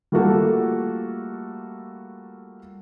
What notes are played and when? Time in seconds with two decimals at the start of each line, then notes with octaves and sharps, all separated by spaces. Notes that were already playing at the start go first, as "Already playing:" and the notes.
0.12 G3 A3 A#3 F4 F#4 A4